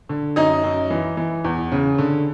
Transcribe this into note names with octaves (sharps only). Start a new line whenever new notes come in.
D3
F#2 D#4 D#5
F#2
E3
E3
E2
C#3
D3